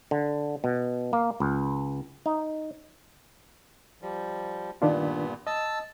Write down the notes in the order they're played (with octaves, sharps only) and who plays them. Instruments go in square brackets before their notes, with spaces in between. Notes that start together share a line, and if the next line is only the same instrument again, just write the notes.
[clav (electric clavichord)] D3
B2
A#3
C#2
D#4
[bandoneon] F3 G3
[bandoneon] G2 A#2 B3 [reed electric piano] D#3 D4 F4
[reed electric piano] D#5 [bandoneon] A5 E6